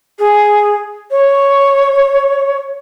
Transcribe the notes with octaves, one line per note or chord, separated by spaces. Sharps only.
G#4
C#5